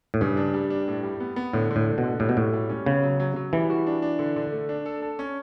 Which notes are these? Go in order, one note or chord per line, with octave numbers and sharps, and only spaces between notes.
A2
G2 C#3
D4
G3
D4
A2
G3
B3
B3
A2 D3
D3
A2
D3
B2
D3
A2 G3
B2
A2 F#4
G3
C#4
C#3 B3
F#3
F#3
F#3
E3 G3
F#4
D4
D4
D3
D3
A3
D4
A4
A4
C#4